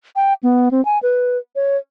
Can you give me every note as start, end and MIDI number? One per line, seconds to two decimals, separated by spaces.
0.16 0.34 79
0.43 0.69 59
0.71 0.84 60
0.85 0.99 80
1.03 1.38 71
1.56 1.77 73